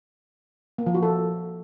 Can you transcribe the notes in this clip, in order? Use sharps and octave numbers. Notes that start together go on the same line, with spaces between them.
A#3
F3
F#4
A4